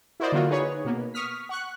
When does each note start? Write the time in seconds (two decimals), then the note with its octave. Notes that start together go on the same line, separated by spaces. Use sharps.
0.20 E4 F#4 A#4 C5 D5 D#5
0.32 D3 F#3 A#3 F4 F#4
0.50 D#4 G#4 B4 C#5
0.85 B2 A#3 B3
1.14 C#6 D#6 F6 B6
1.49 F#5 C#6 F#6